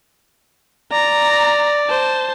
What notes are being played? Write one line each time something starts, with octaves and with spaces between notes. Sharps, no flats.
D5 A#5
C5 A5